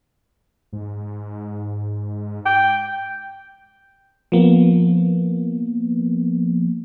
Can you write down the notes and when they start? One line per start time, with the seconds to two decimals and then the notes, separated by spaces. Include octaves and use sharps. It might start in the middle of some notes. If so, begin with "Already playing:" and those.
0.73 G#2
2.46 G5
4.32 F3 A#3 B3